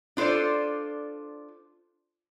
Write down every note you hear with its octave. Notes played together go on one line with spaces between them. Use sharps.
D4 F4 A4 C5 D5